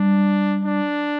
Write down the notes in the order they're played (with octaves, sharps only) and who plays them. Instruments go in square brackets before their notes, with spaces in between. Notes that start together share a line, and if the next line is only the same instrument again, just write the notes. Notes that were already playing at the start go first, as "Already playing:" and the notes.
Already playing: [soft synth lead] G3 [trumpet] D4
[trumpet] D4